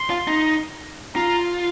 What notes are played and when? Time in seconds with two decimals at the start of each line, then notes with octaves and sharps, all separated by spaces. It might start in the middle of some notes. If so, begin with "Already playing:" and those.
Already playing: C6
0.10 F4
0.27 D#4
1.15 F4 A#5